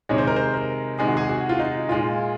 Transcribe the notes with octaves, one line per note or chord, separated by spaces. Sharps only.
C3 D#3 G#3 C#5
C5
A#4
C5
A#4
C3 D#3 G#3 G#4
F#4
G#4
F#4
F4
D#4
A#2 G#3 F4